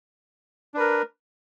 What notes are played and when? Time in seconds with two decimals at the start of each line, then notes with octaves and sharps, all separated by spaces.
0.74 D4
0.77 B4
0.80 A#4